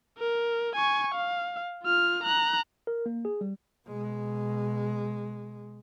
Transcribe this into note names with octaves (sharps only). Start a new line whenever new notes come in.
A#4
G#5 C#6
F5
F4 F6
A#5 F#6
A#4
A#3
G#4
G3
B2 G#3